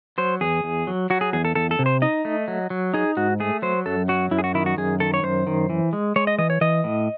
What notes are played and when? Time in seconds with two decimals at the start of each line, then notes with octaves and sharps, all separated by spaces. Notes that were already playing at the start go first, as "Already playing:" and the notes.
0.18 F#3 C5
0.41 E2 G#4
0.64 E2
0.87 F#3
1.10 F#3 F#4
1.21 G#4
1.33 E2 G#4
1.45 A4
1.55 E2 A4
1.71 A4
1.79 C3
1.86 C5
2.02 D#4 D#5
2.25 A3
2.48 F#3
2.70 F#3
2.94 D#4 G#4
3.17 G#2 F#4
3.40 A3 G#4
3.62 F#3 C5
3.86 F#2 A4
4.08 F#3 F#4
4.31 F#2 E4
4.39 G#4
4.44 F#4
4.54 D#3 E4
4.66 F#4
4.78 F#2 G#4
5.00 D#3 A4
5.14 C#5
5.23 F#2 C5
5.47 D#3
5.70 E3
5.93 G#3
6.16 G#3 C#5
6.27 D#5
6.38 E3 D#5
6.50 C#5
6.61 E3 D#5
6.84 A2